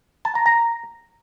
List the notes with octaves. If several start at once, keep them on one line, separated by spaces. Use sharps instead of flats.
A5
A#5
A#5